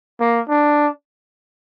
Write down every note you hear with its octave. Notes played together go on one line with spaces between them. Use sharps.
A#3
D4